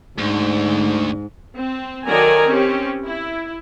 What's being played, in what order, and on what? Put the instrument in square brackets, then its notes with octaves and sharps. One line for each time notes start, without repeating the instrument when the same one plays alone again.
[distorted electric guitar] D2 [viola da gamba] G#2
[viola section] C4
D#3 F#3 A4 D5 G#5 A#5
C4 C#4 G4
E4